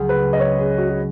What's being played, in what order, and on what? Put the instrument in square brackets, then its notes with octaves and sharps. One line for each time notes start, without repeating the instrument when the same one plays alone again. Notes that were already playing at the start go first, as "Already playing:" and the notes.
Already playing: [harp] C#2 C#3 F#3
[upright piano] B4
D#5
C#5
G#4
F#4
F#4